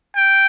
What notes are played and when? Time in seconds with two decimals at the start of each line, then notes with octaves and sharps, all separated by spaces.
0.16 G5